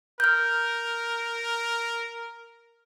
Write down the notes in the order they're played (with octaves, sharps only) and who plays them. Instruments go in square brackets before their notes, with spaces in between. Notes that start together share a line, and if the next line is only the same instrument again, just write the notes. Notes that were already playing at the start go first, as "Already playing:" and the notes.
[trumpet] A#4 [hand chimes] F6 G6